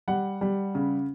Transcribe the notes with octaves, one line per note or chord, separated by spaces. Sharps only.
G3 F#5
G3
C#3